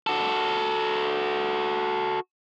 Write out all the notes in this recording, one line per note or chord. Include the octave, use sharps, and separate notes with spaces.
F#4 A4